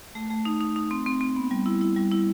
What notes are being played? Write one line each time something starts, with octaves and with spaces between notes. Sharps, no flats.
A3
A3
D#4
D#4
D#4
C4
C4
C4
B3
G3
E4
E4
G3
E4